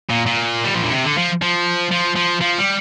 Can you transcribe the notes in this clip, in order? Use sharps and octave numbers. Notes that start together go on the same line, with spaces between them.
A#2
A#2
G3
F3
D3
C3
D3
F3
F3
F3
F3
F3
G3